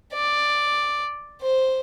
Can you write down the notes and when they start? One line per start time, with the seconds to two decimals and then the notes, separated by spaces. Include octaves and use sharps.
0.13 D5
1.41 C5